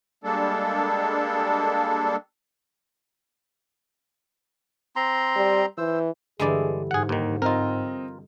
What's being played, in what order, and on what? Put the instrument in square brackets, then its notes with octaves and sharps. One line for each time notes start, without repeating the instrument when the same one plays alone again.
[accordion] G3 G#3 A#3 D4 A4
[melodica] C4 A#5 C6
[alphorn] G3
[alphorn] E3 [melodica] C5 E6
[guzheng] G2 D3 E3 [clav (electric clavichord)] G#3 D5 [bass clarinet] G#4
[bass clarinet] G#2 [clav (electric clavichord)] G#4 F#5
[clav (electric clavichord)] D#2 D#3
[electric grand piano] C4 D#5 [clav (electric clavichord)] F4 A#4